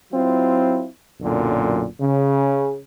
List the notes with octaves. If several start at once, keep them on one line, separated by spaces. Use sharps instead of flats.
F#3 C4 E4 F4
B1 F#2 A#2 D3
C#3